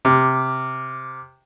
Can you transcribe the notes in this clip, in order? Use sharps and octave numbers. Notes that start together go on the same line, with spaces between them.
C3 D6 F6